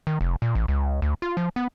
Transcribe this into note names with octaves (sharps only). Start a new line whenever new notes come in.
D#3
F1
A#2
A1
C#2
D2
F4
F3
B3